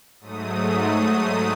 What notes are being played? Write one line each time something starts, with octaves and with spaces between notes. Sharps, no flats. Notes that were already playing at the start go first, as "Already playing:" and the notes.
G#2 F#3 A3 D#6
D#6